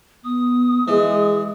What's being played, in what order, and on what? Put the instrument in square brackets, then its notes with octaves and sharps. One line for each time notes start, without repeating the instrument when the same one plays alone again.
[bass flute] B3 [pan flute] D#6
[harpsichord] E3 [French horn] G#3 [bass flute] G#4